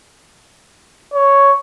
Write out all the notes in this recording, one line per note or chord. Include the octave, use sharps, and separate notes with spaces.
C#5